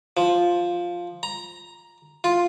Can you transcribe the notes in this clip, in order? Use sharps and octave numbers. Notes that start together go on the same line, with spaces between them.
F3
A#5
F4